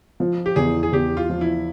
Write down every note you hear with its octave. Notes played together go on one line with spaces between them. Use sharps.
F3
G4
E2 G#4
G#4
E2 G4
F4
F3
E4